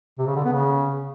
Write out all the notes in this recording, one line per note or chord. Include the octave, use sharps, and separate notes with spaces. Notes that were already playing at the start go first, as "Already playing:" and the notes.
C3
C#3
D3
B3
C#3